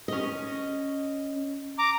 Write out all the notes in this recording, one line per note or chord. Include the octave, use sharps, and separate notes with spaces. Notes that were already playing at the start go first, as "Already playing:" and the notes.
C#4 D#5
A#5 D6